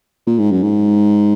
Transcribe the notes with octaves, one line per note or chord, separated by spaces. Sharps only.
A#2
G#2
F#2
G#2